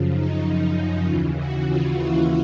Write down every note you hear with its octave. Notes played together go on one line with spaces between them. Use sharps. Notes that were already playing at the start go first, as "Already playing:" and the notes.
Already playing: F#2 C#3 F3
D#4
D#2 C#3 E3 F4
F#4
F4
E4